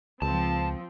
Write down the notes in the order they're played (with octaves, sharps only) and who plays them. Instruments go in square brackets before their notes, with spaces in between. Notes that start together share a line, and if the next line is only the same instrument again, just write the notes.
[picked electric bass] C#2 [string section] F3 C4 [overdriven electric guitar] A5